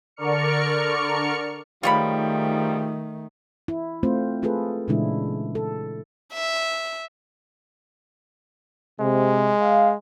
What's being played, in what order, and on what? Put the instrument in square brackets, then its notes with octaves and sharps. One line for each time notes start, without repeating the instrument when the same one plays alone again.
[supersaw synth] D3 A#4 D5 C#6 F6 C#7
[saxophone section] G#2 F3 G3 [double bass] D#3 A3 [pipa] F4 C#5 B5
[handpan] E4
A3 C4 F4 C5
A3 F4 G#4 A4 B4
A#2 C#3 E3 G#3 D4 E4
A4
[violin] E5
[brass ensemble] C3 [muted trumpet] G#3
[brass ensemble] F5